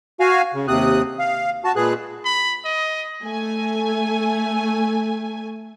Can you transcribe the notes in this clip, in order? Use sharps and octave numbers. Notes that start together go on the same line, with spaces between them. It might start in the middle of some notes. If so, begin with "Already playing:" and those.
F#4 F5 G#5
C#3
D#2 C3 C4 D#6 F#6
F5
F#4 A5
A#2 G#3 G#4 B4 F#6
B5
D#5
A3 G#5